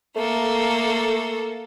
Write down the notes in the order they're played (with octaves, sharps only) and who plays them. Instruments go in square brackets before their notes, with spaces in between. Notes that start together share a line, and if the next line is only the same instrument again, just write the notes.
[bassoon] A3 [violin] A#3 A4